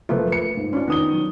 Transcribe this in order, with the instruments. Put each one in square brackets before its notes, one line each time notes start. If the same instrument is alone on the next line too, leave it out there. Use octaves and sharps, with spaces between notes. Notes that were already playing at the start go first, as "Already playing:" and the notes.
[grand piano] F#1 F3 A3 [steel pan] F4 A#4 B4
[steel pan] A3 [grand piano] C#7
[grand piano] G#2
[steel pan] C#4 D4 F4
[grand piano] D#3 D#6 G7 [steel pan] B3
[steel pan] F#3